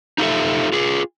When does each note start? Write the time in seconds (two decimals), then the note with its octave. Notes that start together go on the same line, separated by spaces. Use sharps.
0.18 D#4 F4 G4 A4 E5
0.72 F4 G#4